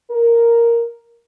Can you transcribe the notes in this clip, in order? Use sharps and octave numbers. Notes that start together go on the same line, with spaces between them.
A#4